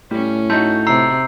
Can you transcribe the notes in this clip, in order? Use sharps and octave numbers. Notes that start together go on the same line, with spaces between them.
A2 G3 C#4
A3 D#4 F#4 G6
C3 A#5 E6 C7